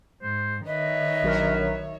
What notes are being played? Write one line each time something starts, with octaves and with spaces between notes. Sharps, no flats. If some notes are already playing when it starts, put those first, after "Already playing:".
G#2 C5
D#3 B4 C#5 D#5 E5
A#1 F#3 A#4